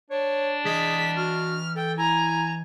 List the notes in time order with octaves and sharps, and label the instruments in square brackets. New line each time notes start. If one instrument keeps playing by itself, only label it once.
[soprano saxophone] D4 [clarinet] C#5
[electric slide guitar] E3 D#5 [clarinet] G#4 [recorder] B6
[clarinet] F#4 [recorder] F6
[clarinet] A4 [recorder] G5
[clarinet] E4 [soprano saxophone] G#5 [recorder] A#5